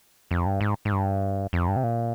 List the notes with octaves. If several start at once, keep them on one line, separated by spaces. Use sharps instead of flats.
F2
G2
G#2
G#2
G2
F2
G2
C3
A#2